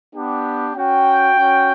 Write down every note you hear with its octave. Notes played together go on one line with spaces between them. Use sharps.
B3 D4 G4
C#4 F#4 G5
C#4 F#4